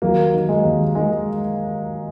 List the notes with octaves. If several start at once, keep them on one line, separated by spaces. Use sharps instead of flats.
D#2 F#3 A#3
D#3
G#3
D#2
D#3 G#3